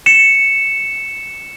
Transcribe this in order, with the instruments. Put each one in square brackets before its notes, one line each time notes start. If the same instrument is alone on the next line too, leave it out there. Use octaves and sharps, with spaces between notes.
[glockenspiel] C#7 E7